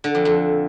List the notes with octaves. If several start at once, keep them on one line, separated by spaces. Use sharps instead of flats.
D3
F2
F2